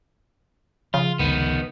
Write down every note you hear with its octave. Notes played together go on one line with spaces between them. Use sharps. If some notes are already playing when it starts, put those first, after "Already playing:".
C#3 F3 F4
F1 C#2 D#3 B3